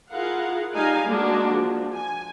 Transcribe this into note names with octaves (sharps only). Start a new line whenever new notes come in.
E4 F4 G#4 A#4 F5 F#5
G3 D#4 F5 G#5
G#3 A#3 D4 F#4
F3
G#5